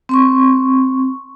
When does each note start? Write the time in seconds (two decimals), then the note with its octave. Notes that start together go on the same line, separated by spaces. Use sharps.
0.09 C4 C6 C#6